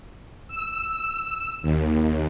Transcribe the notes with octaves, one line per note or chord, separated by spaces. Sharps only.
E6
D#2